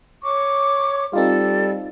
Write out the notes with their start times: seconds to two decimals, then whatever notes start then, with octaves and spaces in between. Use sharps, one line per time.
0.24 C#5 C#6 D6
1.13 G3 C4 D#4 F4 A4